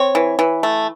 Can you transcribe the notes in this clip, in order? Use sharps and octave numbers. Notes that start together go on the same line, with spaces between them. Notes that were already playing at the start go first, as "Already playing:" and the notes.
Already playing: C4 C#5
E3
E3
A3